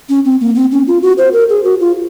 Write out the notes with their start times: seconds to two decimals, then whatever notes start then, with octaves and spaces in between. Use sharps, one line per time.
0.09 C#4
0.25 C4
0.41 A#3
0.55 C4
0.72 C#4
0.87 F4
1.02 F#4
1.18 C5
1.33 A#4
1.50 G#4
1.64 F#4
1.80 F4